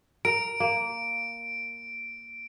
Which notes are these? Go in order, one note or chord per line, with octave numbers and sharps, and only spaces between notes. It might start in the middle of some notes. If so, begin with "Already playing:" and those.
A#4 D7
A#3